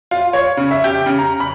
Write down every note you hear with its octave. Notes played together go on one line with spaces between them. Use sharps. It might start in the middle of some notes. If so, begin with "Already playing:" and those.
F4
C#5
C#3
E5
G4
C#3
A#5
B5